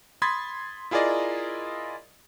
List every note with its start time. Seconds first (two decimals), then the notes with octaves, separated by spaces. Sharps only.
0.22 B5 C6 D#6 G#6 A6 B6
0.91 E4 F4 G#4 A#4 D5 D#5